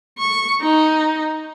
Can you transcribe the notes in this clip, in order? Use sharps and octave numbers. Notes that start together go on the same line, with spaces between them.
C#6
D#4